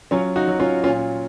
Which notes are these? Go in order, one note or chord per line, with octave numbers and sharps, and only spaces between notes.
F#3 C#4 F4
D#4 F#4
F#3
C#4 F4
A#2 C#4 F4